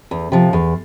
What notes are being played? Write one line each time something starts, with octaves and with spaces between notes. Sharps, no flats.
E2
C3 F3
E2